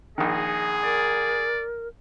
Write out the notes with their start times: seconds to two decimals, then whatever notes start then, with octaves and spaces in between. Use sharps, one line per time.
0.18 A#1 D#3 G#4 D#5
0.84 A#4 D5